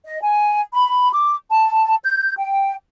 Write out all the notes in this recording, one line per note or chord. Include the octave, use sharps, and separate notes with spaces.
D#5
G#5
B5
D6
A5
G6
G5